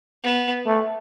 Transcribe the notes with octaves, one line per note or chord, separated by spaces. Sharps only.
B3
A3